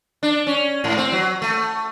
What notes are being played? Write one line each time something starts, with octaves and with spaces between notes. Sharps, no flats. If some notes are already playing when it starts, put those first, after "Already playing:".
D4
C#4
G#2
C4
F#3
A3